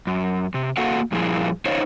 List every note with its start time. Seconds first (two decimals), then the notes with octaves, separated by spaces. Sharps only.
0.07 F#2
0.54 C3
0.77 A#3 F#4 A4 F5 F#5
1.12 G2 A#2 F3 E4 G#4 F5
1.66 D#4 C5 C#5 D#5 F5